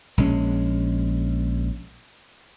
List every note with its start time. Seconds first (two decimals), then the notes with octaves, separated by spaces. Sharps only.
0.17 A#1 G#3 C#4